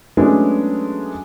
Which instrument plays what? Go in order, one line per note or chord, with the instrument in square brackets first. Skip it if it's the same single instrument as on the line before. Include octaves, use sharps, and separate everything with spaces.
[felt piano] F#3 G#3 A3 B3 C#4 D4